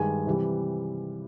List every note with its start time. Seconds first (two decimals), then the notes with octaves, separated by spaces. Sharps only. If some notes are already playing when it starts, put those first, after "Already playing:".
Already playing: G2 D#3 G#3 G#5
0.26 C3 E3 G3